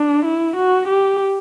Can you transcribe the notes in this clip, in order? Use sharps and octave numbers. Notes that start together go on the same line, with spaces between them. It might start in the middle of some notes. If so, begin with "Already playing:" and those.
Already playing: D4
E4
F#4
G4